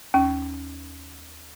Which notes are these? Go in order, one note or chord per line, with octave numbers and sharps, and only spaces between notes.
D#2 C#4